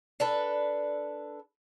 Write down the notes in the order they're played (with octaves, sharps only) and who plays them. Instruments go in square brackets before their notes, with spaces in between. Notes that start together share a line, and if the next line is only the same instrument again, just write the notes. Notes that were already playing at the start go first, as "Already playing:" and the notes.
[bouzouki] D4 A4 B4